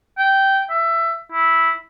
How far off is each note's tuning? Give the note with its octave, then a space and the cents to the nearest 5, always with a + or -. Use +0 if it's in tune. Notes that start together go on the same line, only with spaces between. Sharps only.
G5 -10
E5 +20
E4 -10